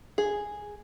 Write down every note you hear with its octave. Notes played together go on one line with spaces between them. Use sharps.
G#4